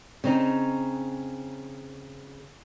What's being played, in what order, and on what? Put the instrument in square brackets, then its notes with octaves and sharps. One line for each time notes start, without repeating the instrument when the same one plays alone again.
[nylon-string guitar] C#3 C4 D#4